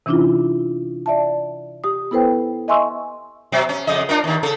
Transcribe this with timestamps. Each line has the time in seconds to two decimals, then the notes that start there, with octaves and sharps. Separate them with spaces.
0.06 C3 E3 C#4 D4 E4 F4
1.06 D5 E5 A5
1.84 G4 D#6
2.11 B3 E4 A4 B4 C5 G5
2.68 D#5 E5 G#5 C6 C#6 E6
3.52 B2 F#3
3.69 C#4
3.87 F2 C#3 D#5
4.09 D4 F4 A#4
4.24 D#2 D#3
4.43 C#3 A4